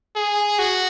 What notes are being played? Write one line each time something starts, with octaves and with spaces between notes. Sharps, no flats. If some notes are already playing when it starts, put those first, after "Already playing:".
G#4
F#4